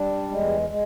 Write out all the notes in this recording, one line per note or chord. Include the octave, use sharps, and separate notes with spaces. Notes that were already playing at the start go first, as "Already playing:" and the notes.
Already playing: G3 D4
E2 G#3
G#3